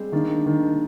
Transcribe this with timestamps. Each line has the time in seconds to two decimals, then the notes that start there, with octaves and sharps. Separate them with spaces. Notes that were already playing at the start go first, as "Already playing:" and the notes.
Already playing: G3 G#3 C4
0.12 D#3 A#3 D4
0.46 D#3